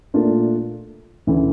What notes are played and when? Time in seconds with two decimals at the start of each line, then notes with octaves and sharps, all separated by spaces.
0.14 A#2 A3 D4 F4 A#4
1.27 D2 C#3 E3